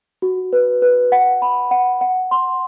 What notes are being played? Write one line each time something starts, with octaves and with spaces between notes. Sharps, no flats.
F#4
B4
B4
F#5
B5
F#5
F#5
C6